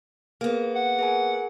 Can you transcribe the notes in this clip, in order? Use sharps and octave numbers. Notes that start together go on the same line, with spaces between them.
A#3 B3 G#4
F#5
G#4 A#4 G#5